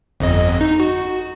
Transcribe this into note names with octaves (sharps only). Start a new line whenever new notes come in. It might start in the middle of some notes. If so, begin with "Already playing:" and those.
G1 F2 D#5
D#4
F#4